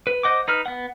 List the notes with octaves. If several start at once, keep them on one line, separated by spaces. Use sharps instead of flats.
B4
C5 D#5 F#5 D6
D#4 B4 F6
B3 F#5